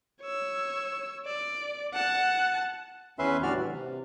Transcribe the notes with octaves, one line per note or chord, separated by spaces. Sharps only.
C#5 E6
D5
F#5 A5
E2 C#4 B4 E5 C6
A2 D3 G3 F#4 D5 F6
E3
C3